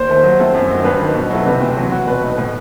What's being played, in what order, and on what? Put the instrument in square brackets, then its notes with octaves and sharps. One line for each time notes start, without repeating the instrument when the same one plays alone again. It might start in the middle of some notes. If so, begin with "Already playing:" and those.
Already playing: [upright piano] D#2 [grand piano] C5
[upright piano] D#3 A3
F#3
A3 C4 E4 A4
F#2
D#3 F#3
[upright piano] G2 [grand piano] B4
[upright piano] D#3 G3 D#4
B2
F#3 A3 E4 A4
[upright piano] C3 [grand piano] B4
[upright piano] E3 A3 C4
F#3
C4 F#4
[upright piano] B2 [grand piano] B4
[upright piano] A3 D#4
A2